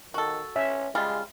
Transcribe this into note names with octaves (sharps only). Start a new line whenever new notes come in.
D#3 F#4 A4
C#4 E5
C#3 G3 G#3 F4